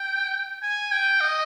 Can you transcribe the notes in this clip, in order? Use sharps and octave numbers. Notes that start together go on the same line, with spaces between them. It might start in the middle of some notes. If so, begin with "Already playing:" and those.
Already playing: G5
G#5
G5
D#5